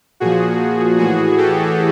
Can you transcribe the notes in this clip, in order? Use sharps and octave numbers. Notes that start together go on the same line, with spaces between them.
A#2 F3 F#4 G#4
A2 E3 F#4 G#4
G4 A4